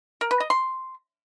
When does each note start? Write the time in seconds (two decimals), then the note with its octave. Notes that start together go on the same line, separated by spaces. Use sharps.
0.21 A#4
0.31 B4
0.40 D#5
0.50 C6